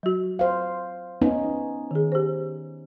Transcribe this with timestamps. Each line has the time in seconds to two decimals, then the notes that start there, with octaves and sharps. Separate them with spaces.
0.03 F#3 F#4
0.39 C5 F5
1.22 B3 C#4 D#4
1.91 D#3 G#4
2.12 G4 C5